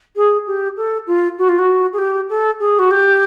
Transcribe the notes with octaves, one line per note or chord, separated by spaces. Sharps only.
G#4
G4
A4
F4
F#4
F4
F#4
G#4
G4
A4
G#4
F#4
G4